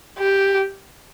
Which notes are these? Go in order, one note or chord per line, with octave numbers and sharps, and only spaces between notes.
G4